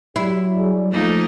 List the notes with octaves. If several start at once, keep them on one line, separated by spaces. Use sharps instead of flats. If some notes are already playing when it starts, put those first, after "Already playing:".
F#3 E4 G4
G2 G#4 D5
F3 A3 A#3 D#4